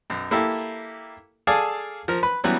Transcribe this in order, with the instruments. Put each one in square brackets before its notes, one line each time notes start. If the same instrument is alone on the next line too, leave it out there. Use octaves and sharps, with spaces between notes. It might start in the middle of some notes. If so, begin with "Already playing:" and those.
[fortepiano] B1 F#2
A#3 E4 G4 A4
G#4 A4 D5 F5 G#5 A5
F3 A#4
B4 B5
E3 F#3 G3 B3 C#4 E4